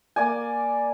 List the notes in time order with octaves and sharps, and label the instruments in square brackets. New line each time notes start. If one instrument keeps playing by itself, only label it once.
[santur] A#3 D5 G#5